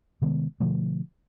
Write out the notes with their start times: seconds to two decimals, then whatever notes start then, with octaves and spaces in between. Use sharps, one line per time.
0.22 C3 D#3 G#3 B3
0.60 B2 D3 F3 A3